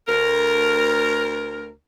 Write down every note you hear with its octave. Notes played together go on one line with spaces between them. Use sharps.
D2 A#4